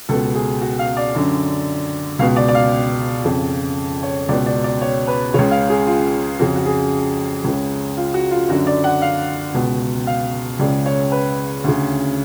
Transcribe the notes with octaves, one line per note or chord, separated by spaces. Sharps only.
C#2 B2 A4
G#4
F#4
F5
D5
F#2 D3
C#2 B2 F5
D5
D5
F5
F2 C#3
C#5
C#2 B2 D5
D5
D5
C#5
B4
C#2 C#3 C#5
F5
G#4
F4
F2 C#3 F#4
F#4
G#4
C#2 C#3
F4
F#4
F4
F#2 D3 F#4
D5
F#5
F5
C#2 B2
F5
C#2 C#3 D5
C#5
B4
D2 C#3